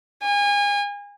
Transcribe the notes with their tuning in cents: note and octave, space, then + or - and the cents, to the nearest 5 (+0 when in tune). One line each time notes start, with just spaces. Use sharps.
G#5 -35